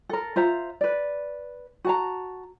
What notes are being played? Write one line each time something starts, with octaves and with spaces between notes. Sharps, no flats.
A4 A#4
F4 C5 E5 A#5
B4 D5
F#4 A5 A#5